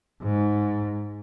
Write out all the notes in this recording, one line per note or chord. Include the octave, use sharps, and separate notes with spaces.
G#2